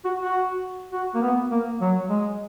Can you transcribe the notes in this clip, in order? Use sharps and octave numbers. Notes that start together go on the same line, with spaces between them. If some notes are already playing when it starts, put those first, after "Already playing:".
F#4
F#4
F#4
A#3
B3
A#3
F#3
G#3